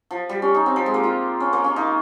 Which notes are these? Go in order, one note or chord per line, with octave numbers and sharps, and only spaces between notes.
F3
G3
C#4
D#4
C4
F3
G#3
A#3
F4
C#4
A#3
C#4
D#4